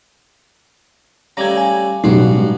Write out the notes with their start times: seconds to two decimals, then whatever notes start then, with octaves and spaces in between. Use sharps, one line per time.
1.37 C#3 G3 A3 A#5 G#6
1.57 G#5
2.04 A1 G2 B2 F#3 G#3 D#4 F#4